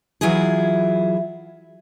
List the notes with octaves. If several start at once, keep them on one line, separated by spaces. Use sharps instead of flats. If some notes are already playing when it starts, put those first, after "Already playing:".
E3 F#3 E4 F4 G#4